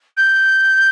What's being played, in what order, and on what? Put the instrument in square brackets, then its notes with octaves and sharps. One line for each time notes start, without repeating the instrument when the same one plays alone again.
[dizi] G6